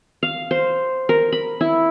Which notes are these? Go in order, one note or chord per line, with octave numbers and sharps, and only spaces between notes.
F5
C5
A#4
B5
E4